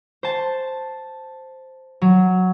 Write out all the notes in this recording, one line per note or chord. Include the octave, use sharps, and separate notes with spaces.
C5 A5
F#3